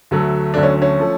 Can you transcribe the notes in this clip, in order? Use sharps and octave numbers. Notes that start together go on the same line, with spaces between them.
D2 D3 F#3 A3
D2 D3 F#3 A3 D4
C#4
C#4
F3 A3